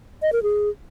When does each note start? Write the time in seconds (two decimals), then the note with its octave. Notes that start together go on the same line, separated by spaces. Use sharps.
0.22 D#5
0.33 A#4
0.43 G#4